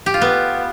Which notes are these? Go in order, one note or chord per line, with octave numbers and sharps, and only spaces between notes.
G4
F4
B3